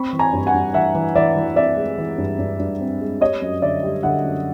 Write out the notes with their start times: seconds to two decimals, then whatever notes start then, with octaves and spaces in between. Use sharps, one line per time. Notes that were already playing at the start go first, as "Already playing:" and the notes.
Already playing: C4 B5 C#6
0.13 E3
0.19 G#5 A#5
0.33 G2
0.47 F#5 G#5
0.54 G2
0.74 E3 E5 F#5
0.95 E3
1.15 E3 D5 E5
1.36 E3
1.56 C4 D5 E5
1.77 G#3
1.98 E3
2.18 G2
2.39 G2
2.60 G2
2.80 C4
3.01 G#3
3.21 G3 C#5 D#5
3.42 F#2
3.62 D3 D5 E5
3.83 G3
4.03 D3 E5 F#5
4.24 F#2